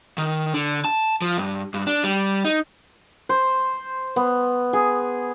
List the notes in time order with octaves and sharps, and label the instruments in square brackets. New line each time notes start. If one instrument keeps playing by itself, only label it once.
[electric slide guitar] D#3
D3
A5
F3
G2
G2
D4
G3
D#4
[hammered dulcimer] C5
B3
G#4